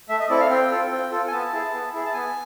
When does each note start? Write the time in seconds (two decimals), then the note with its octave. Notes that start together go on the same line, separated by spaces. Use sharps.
0.09 A3 E5
0.20 D#5
0.30 C4 E4 A4 D5
0.40 F5
0.50 C4 G5
0.71 F4 A4
0.92 C4
1.11 F4 A4
1.28 G#5
1.32 B3 A5
1.53 E4 G#4
1.74 B3
1.93 E4 G#4
2.05 A5
2.14 B3 G#5